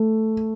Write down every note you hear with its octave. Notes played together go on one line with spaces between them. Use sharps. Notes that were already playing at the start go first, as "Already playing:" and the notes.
Already playing: A3